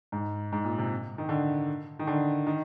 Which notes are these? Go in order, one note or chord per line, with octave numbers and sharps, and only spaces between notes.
G#2
G#2
A#2
C3
D#3
D3
D#3
D3
D#3